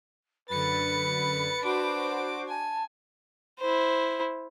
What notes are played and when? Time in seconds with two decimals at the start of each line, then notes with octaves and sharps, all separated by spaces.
0.50 F#2 D3 B4 B5 A6 C#7
1.64 D4 F#4 C5 D6
2.48 G#5 A5
3.60 E4 C5